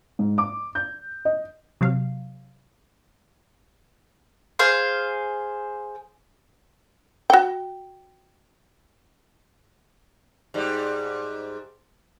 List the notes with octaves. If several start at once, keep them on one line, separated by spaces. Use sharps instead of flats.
G#2
D6
G6
D#5
C3 F#3 F5
G#4 C5 F5
F#4 G5
G#2 G3